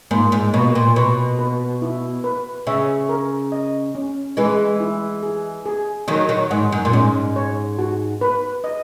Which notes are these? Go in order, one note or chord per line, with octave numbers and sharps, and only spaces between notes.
G#2 A#3
G#2
B2 A#3
A#2
B2 B4
B4
E4
B4
C#3 E5
A#4
D#5
C#4
E3 G#3 B4
E4
G#4
G#4
D#3 F#3 D#5
D#3 F#3
G#2 F#5
F#2
A#2
G#2 C#4
C#5
F#4
B4
D#5